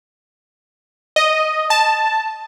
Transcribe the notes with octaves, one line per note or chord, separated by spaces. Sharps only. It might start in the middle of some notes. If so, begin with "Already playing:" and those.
D#5
A5